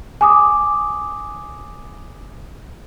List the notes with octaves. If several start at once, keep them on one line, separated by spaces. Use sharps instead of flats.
G#5 D6 D#6